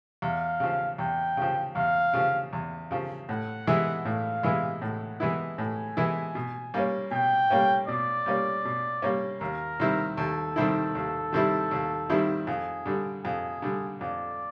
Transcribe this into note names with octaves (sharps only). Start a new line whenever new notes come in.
E2 F5
C#3 F3
E2 G5
C#3 F3
E2 F5
C#3 F3
E2
C#3 F3
A2 F#5
E3 G#3 B3 E4
A2 F5
E3 G#3 B3 E4
A2 F#5
E3 G#3 B3 E4
A2 G#5
E3 G#3 B3 E4
B2
G3 A#3 C#4
B2 G5
G3 A#3 C#4
B2 D5
G3 A#3 C#4
B2
G3 A#3 C#4
D#2 A#4
D#3 G3 C4 E4
D#2 A4
D#3 G3 C4 E4
D#2
D#3 G3 C4 E4
D#2
D#3 G3 C4 E4
F2 G#4
D3 G3
F2 G#4
D3 G3
F2 D5